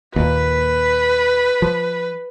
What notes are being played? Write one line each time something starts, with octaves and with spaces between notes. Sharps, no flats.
D#2 A#2 B4
F3